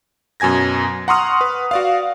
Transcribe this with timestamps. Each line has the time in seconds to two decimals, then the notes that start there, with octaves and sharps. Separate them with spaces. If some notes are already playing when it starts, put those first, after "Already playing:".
0.40 F#2 B2 G#5 G#6 A#6
1.08 F#5 A#5 C6 C#6 D#6 F6
1.41 B4
1.71 F#4 D5 F5